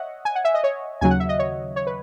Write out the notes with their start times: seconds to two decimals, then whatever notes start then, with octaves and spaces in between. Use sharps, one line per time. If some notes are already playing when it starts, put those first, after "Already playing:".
Already playing: C#5 D#5 E5 F#5
0.25 G#5
0.35 F#5
0.45 E5
0.54 D#5
0.64 C#5
1.01 D#2 C#3 F#3 G#5
1.10 F#5
1.20 E5
1.29 D#5
1.39 C#5
1.76 C#5
1.87 B4